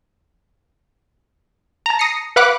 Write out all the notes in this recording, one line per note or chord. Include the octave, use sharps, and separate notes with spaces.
A5 A#5
D#6 A#6 C7 C#7
B4 F5 F#5 B5 D6 F#6